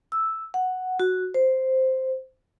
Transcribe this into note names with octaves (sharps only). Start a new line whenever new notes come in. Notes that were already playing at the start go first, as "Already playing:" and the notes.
E6
F#5
F#4
C5